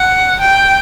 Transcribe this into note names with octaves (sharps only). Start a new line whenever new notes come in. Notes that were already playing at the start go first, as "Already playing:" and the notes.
Already playing: F#5
G5